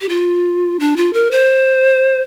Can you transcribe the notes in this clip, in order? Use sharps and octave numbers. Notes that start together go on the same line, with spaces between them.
G4
F4
D4
F4
A#4
C5